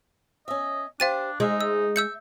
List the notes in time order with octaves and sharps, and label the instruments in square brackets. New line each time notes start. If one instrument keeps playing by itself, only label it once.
[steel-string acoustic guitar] C#4 E5 [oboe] D#5
[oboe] D4 [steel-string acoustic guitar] G4 C5 [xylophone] F5 A6 D#7
[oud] G#3 [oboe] D#4 [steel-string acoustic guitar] C5 E5
[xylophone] E6
[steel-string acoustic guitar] E5 [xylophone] E6 G6 C#7